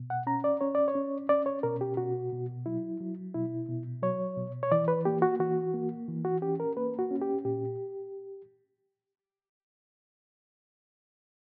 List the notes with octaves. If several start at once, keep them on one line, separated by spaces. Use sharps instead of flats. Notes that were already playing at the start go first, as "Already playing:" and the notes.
Already playing: B2
F#5
C#4 A#5
D5
C#4 C#5
D5
C#5
C#4
C#4 D5
C#5
B2 A#4
G4
B2 F#4
B2
F#3 E4
F#3
B2 E4
B2
F#3 C#5
B2
C#5
E3 D5
B4
A#3 G4
F#4
E3 F#4
A#3
E3
F#4
C#4 G4
A#4
A#3 B4
F#4
C#4
G4
A#2 G4